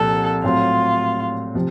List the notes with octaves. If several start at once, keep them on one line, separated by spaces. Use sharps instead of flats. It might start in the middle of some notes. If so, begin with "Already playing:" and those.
Already playing: C2 A#2 F3 A4
A2 F#3 A3 C4 F4
C3 F3